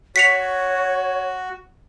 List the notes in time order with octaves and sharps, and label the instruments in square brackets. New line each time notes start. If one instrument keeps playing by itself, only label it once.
[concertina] F#4 [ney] C#5 [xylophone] B6 C#7 F7